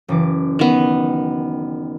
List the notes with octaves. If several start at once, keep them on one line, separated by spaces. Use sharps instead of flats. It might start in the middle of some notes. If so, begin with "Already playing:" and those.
F#1 E3 D6
D#3 B3